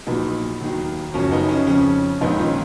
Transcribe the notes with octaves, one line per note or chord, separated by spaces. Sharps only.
A#1 A#2 F#3 B3 D#4
D#2 D#3 F#3
F#1 F#2 F3 C#4
B3 D#4
C#4
F2 C#3 F3 C#4
A#1 G#2 D#3 B3 D#4
C#4 F4